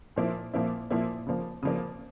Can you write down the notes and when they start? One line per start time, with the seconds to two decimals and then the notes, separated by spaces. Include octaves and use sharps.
0.16 A#2 F3 A#3 E4
0.53 A#2 F3 A#3 E4
0.90 A#2 F3 A#3 E4
1.27 C#3 F3 A#3
1.63 C#3 F3 A#3